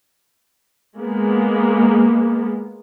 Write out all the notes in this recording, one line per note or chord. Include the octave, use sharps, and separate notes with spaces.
G#3 A#3 B3